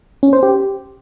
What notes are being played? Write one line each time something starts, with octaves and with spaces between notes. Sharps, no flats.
C#4
C5
G4